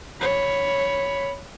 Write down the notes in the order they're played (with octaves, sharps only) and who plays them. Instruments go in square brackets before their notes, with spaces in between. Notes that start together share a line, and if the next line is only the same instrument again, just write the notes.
[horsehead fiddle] C#5 B5